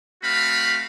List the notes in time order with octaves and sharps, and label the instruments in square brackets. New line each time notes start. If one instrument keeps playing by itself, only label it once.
[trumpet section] A3 C4 F#4 F5 B5